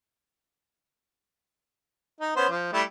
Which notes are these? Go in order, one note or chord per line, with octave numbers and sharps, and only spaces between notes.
D#4
B3 C#4 C5
F3
G3 A3 E4